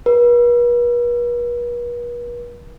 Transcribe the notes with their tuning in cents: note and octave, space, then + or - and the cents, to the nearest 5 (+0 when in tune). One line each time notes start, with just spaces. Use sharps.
B4 -45